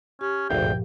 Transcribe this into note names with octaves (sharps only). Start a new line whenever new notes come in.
C#4 G4
G#1 D2 G2 A#2 F3 F5 G5